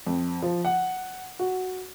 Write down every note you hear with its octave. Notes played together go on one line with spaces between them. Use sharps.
F2
F3
F#5
F#4